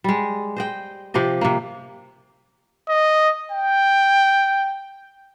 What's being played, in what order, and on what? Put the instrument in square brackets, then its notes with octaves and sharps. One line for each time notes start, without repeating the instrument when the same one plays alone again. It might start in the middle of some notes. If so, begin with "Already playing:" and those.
[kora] G3 G#3
C5 D#5 G5
C3 F3 G4 D#5
C3 A#3
[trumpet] D#5
G5